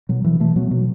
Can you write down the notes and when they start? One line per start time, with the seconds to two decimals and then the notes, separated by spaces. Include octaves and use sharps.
0.09 B2 F#3
0.24 B2 E3
0.39 B2 E3 A3
0.56 B2 F#3 B3
0.71 B2 F#3